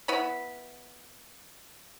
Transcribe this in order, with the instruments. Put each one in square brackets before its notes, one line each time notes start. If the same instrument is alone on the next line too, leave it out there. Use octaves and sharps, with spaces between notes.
[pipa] B3 E4 B5